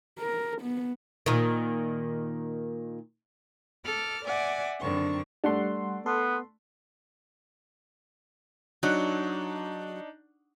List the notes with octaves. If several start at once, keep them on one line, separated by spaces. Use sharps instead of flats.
A#4
B3
A#2 D#3
A4 D6 F6
D5 E5 F#5 G#5 D6
F#2 D3 D#3 C4 C#6
G3 A3 D4 F#5 C6
B3 A4 C6
F#3 D4 D#4